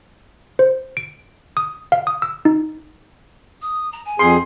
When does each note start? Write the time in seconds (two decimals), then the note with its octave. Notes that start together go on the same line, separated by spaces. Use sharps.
0.59 C5
0.97 D7
1.57 D#6
1.92 F5
2.07 D#6
2.22 E6
2.45 D#4
3.61 D#6
3.92 A#5
4.05 G#5
4.19 F2 G#4 C6